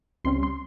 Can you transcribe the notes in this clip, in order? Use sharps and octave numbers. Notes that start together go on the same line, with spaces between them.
C#2 C3 G3 C#4 C6
C6